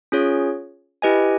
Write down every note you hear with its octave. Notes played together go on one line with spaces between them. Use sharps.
C#4 F4 G#4 C#5
E4 G4 B4 D#5 G#5